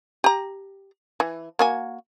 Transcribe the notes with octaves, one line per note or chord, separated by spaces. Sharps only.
G4 A#5
E3
A#3 F#4 G#5